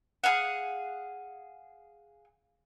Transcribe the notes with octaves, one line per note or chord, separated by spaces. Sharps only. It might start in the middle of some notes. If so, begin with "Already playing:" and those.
G#4 F5 F#5